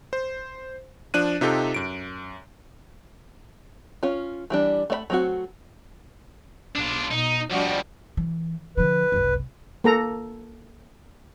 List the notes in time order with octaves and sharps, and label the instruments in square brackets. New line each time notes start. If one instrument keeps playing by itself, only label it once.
[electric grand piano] C5
F3 D4 F#6 D#7
C3 D#4 F4 G4 A4
F#2 D7
[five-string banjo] C#4 F4
E3 G3 D4
A3 D5 B5
F#3 A3 C4 D4 F#4
[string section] B1 [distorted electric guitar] D4 F4
[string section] B2 [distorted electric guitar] D#4
[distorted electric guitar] F3 G3 [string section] D4 F#4 D#5
[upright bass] E3
[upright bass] D3 F3 [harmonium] B4
[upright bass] F#1 C2
[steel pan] A#3 A4 A#5